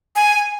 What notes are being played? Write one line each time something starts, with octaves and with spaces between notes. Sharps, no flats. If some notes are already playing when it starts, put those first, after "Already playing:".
G#5